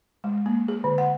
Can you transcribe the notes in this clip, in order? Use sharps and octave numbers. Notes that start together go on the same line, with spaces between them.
G#3
A#3
G#4
D3
F#5